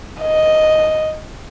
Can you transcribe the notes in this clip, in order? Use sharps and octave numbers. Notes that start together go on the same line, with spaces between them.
D#5